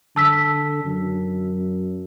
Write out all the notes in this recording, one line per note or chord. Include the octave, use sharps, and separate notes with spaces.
D3 A5 E6 B6
F#2